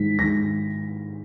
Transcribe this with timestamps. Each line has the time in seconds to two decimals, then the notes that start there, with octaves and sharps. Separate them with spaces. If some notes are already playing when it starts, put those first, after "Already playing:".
Already playing: G#2 D#3 G#3 B6
0.18 G#2 D#3 G#3 A#6